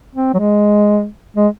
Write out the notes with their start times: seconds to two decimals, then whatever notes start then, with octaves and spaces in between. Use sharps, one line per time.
0.15 C4
0.34 F#3
0.39 G#3
1.37 G#3